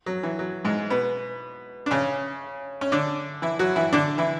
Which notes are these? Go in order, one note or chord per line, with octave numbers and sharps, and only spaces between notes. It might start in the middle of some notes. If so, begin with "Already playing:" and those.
F#3
E3
F#3
G#2 G#3
B2 B3
D4
C#3 C#4
C#4
D3 D4
E3 E4
F#3 F#4
E3 E4
D3 D4
E3 E4